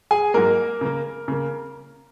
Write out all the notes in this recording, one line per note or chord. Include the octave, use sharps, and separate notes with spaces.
G#4 G#5
G#2 F#3 A#3 A#4
C#3 A#3
C#3 A#3